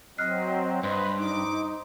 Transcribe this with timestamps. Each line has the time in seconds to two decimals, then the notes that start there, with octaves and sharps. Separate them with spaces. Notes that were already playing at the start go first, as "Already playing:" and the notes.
0.18 F#3 C4 D#5 F6 F#6 C7
0.83 G2 B4 C5 D#5 C6
1.18 D#4 D6